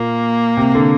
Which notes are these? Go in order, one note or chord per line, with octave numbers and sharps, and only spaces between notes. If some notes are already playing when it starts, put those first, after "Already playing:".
Already playing: A#2 A#3
C3
D3